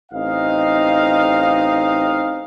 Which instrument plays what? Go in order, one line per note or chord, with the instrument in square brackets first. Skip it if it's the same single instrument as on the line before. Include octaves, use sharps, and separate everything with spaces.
[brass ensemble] A1 C4 D#4 D#5 F5